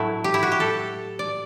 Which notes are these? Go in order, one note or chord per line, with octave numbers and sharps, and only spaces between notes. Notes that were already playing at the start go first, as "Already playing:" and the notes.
Already playing: A2 F#3 A3 E4
G4
E4
F#4
G4
A4
D5